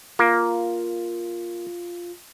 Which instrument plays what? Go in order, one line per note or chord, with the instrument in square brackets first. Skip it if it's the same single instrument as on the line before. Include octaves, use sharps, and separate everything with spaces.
[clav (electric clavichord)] A#3 [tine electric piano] F4